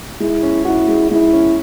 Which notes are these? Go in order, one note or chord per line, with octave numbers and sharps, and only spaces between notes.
G#3 E4
C#4
E4 F#4
G#3
G#3 E4
C#4